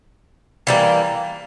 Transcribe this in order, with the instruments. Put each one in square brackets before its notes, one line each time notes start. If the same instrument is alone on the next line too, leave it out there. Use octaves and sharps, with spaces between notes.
[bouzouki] E3 G3 A#3